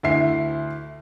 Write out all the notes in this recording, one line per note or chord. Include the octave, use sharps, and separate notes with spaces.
D2 E4 C7